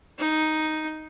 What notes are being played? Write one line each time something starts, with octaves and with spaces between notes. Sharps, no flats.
D#4